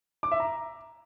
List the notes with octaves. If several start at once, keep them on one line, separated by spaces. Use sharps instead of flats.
D6
E5
A#5